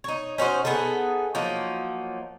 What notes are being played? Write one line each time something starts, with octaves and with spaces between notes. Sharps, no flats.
D#4 C#5
C#4 D#4 F#4 C5
B3 D#4 G#4 A4
F3 F#3 A#3 D#4